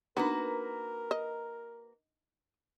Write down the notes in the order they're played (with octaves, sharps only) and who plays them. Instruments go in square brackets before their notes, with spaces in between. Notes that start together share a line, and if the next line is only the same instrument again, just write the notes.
[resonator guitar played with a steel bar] A#3 F#4 B4 [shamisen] B3 [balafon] D4 D#4 [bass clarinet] A#4
[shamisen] D#5